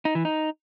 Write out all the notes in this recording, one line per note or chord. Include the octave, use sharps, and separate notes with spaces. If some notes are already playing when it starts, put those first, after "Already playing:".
D#4
E3
D#4